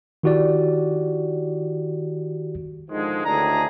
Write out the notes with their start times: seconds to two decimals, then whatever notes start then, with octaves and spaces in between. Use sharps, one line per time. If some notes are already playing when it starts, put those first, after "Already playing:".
0.23 D#3 E4 F#4 G4 D5
2.90 G#2 D3 D#3 F3 G#3
3.26 D2 A2 D#3 D4 G#4 A#5